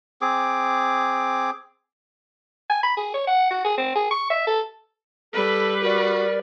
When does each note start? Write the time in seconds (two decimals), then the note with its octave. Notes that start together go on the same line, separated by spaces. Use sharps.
0.22 C4 G#4 D6
2.70 G#5
2.83 B5
2.97 G#4
3.14 C#5
3.27 F#5
3.50 F#4
3.64 G#4
3.78 C4
3.95 G#4
4.11 C#6
4.30 E5
4.47 A4
5.33 G3 A4 B4
5.82 F#4 A#4 D5